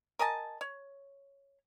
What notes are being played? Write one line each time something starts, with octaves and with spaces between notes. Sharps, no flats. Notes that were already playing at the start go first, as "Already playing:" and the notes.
A#4 D#5 G#5 A5
C#5